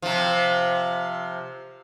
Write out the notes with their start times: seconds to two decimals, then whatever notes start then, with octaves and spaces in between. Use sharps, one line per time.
0.02 C3 F3